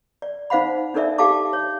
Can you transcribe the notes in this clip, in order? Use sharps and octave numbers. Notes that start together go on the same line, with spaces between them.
D5
D#4 C5 F5 F#5 B5
D4 D#4 A4 A#4 D5 E5
G4 A4 F5 A5 D6
C#5